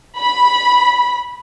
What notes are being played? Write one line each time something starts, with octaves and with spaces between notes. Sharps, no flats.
B5